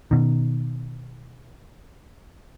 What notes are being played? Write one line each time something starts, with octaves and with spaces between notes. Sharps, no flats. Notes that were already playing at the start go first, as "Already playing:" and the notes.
B2 D#3